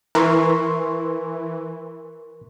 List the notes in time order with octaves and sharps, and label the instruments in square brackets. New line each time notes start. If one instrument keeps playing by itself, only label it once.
[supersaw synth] E3 [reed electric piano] A#4 C6 C#6